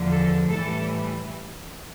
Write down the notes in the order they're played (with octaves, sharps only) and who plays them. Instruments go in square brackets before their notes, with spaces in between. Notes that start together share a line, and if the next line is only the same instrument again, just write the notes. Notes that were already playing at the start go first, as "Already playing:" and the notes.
Already playing: [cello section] E2 D3 F3
A4
A2 E3 G3 A4